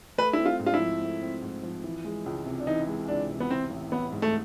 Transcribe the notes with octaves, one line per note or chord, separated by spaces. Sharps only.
A3 B4
E4
C4
F4
G#2
F4
E4
F3
A3
C4
G#2
F3
E3
G#3
C#2
C3
D4
E3 D#4
G#3
C#2 D4
C3
B3
E3 C4
A1
A1 B3
G#2
A3